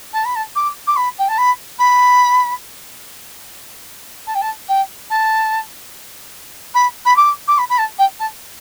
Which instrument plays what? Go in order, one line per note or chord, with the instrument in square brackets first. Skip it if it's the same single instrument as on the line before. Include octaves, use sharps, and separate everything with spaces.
[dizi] A5
B5
A5
D6
D6
B5
G5
A5
B5
B5
A5
G5
A5
G5
A5
B5
B5
D6
D6
B5
B5
A5
G5
A5